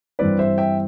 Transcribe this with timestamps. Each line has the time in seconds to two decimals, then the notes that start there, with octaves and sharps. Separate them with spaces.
0.19 G2 E3 G3 C4 B4 D5
0.39 C5 E5
0.58 E5 G5